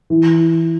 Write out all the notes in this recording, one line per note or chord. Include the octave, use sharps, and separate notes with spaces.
E3